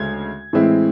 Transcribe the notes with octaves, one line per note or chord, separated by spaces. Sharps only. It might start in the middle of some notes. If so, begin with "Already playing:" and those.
Already playing: D2 C#3 G#3 G#6
A2 E3 G#3 C4 E4